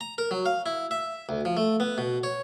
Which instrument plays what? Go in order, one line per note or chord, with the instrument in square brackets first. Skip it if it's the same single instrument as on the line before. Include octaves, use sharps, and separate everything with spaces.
[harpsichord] A#5
A#4
F#3
F5
E4
E5
D2
F3
A3
B3
B2
C#5